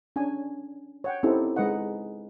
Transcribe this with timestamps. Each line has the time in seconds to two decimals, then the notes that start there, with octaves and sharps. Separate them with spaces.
0.16 C#4 D4 G#5
1.04 C#5 F#5 G5
1.23 C4 C#4 D#4 E4 G4 A4
1.56 G#3 D#4 B4 D#5 F#5